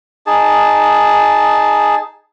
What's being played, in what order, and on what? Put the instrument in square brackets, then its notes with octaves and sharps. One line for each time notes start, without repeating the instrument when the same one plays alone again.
[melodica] D#4 G#4 A5